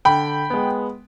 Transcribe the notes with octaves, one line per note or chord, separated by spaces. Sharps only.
D3 G5 B5
G#3 B3